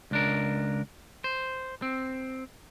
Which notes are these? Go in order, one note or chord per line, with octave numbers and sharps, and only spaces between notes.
C#2 D4 A#4
C5
C4